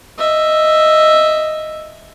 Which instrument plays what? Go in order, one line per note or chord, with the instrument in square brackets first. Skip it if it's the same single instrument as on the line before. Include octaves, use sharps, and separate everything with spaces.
[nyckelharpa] D#5 E5